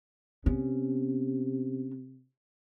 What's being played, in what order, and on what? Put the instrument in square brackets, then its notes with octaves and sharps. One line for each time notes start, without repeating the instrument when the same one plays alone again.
[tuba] C3 [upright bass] B3 C#4